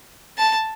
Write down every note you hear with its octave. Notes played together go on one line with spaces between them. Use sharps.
A5